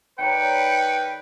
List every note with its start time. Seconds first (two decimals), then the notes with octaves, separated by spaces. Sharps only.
0.19 D#3 B4 C#5 D5 G5 C#7